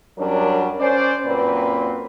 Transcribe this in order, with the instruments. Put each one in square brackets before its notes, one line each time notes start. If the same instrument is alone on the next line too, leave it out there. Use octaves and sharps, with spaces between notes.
[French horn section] F#2 F#3 G3 C#4 D4 A#4
C#4 C5 D5
F#2 A#2 C4 B4